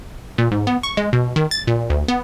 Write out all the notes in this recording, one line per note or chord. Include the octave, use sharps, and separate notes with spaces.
A#2
G#2
B3
C#6
G#3
B2
D#3
A6
A#2
D2
B3